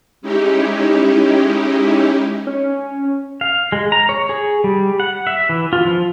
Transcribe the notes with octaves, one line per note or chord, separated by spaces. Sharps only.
G#3 C#4 D#4 E4 G4
C#4
F5
G#3
A#5
C#5
G#4
G3
F#5
E5
E3
F4
F3